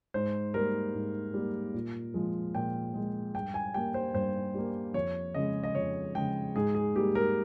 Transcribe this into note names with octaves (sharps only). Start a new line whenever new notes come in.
G#2 C5
G3 A#3 A#4
G#2
G3 A#3
A#2
F3 G#3
A#2 G5
F3 G#3
G2 G5
G#5
G3 A#3 G5
C5
G2 C5
G3 A#3
F2 C#5
C#3 G#3 D#5
D#5
F2 C#5
C#3 G#3 G5
G#2 G#4
G#4
G3 A#3 G4
A#4